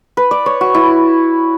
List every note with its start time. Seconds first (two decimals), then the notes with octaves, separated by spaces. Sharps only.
0.17 B4
0.31 D5
0.46 C#5
0.61 F#4
0.75 E4